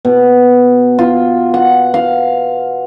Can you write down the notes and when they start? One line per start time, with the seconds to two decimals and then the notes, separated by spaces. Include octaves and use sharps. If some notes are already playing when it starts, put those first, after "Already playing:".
0.05 B2
0.99 F4
1.54 F#5
1.94 F5